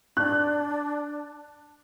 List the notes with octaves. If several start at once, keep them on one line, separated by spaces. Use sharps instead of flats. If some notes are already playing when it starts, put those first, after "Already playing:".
D4 F#6